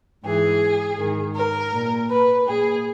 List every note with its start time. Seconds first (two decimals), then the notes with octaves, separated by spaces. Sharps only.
0.23 G#2 E3 G#4
0.98 G#2 D#3
1.35 A#4
1.73 A#2
2.09 B4
2.46 A#2 G#4